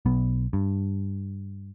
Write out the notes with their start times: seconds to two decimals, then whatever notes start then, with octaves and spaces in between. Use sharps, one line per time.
0.06 B1 B3
0.53 G2